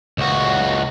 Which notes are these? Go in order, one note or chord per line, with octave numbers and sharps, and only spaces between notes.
C#2 F#4